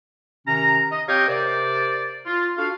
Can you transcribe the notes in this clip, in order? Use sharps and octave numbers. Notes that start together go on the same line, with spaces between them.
C3 D#3 C#4 A#5
D#5
C4 G4 C#5 D#5 F5 G5
C3 A#4 C5 D5
F4
D4 F4 F#4 A4 F5